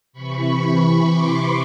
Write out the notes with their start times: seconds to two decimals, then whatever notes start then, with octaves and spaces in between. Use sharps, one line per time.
0.13 C3 E3 B5 C#6
1.07 C6 D6